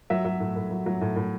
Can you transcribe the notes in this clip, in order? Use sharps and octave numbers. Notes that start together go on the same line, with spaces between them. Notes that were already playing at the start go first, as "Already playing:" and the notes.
F#3 E5
F#3
A2
A2
F#3
F#3
A2
A2